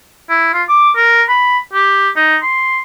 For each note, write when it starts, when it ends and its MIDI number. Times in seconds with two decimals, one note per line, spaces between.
0.29 0.49 64
0.53 0.63 65
0.69 0.90 86
0.96 1.23 70
1.29 1.58 83
1.73 2.09 67
2.16 2.36 63
2.42 2.80 84